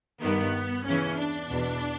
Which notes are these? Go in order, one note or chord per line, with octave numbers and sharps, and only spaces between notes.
G2 D#3 B3
E2 C#3 E3 C#4
D4
E2 B2